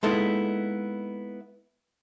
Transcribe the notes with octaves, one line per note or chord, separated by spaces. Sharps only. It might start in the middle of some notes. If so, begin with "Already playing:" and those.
G#3 A#3 B3 D#4 E4 A4